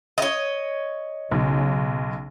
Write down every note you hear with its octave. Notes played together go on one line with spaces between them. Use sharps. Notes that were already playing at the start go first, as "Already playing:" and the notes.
C#5 D#5
B1 C#3